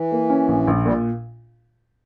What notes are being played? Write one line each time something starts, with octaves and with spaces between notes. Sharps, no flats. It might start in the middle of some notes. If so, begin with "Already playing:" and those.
Already playing: E3
A#3
C#4
A#1
A#1
A#2 G3